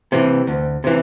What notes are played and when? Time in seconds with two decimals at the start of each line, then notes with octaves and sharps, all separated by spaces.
0.12 C3 E3
0.47 D2
0.84 C3 E3